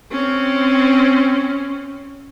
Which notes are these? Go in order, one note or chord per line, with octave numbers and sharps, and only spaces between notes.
C4 C#4